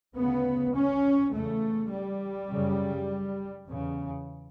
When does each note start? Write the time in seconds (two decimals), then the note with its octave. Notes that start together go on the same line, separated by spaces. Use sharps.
0.15 D2 C#3 B3
0.74 C#4
1.33 E2 C#3 A3
1.91 G3
2.49 F#2 C#3
3.67 E2 C#3